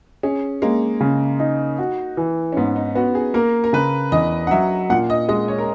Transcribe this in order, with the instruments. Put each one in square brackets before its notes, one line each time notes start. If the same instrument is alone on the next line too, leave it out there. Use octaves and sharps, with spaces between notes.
[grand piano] C#4 [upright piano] G#4
[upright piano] G#3 [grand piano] A#3
[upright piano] C#3
D#4
F#4
E3
[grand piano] C#4
[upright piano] G#2 [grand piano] B3
[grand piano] D#4
[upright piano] B3 [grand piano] F#4
[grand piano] G#4
[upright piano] A#3 [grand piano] A#4
[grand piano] A#4
[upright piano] C#3 [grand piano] B4
[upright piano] E2 [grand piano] D#5
[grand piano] F#5
[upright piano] F#3 [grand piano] E5
[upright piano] A#2 [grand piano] F#5
[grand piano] D#5
[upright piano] G#3 [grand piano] D#5
[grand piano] C#5
A#4